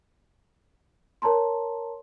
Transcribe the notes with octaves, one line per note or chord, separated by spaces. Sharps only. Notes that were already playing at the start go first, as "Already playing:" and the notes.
A#4 C#5 A5 A#5 C6